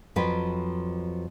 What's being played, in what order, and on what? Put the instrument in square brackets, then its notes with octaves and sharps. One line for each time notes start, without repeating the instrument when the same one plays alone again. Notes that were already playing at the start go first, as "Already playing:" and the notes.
[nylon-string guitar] F2 F3 F#3 B4 G5